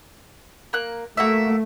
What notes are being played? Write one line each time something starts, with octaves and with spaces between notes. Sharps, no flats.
A#3 F#6
A3 A#3 F#4 E5